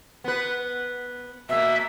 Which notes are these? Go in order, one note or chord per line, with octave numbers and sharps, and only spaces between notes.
B3 B4
B2 A#3 E5